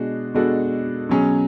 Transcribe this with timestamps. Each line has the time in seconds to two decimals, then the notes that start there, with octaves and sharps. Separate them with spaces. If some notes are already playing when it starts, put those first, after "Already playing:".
Already playing: B2 G#3 D4 F#4
0.34 B2 G#3 D4 F#4 A4
1.09 B2 F#3 C#4 G#4